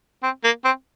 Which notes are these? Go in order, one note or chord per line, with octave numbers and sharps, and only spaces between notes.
C4
A#3
C4